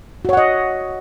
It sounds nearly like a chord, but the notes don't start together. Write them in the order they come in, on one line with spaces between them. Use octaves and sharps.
F#4 C#5 F#5 D#5